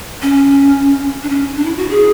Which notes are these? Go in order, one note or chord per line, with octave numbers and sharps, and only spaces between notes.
C#4
D4
C#4
D4
E4
F#4
G#4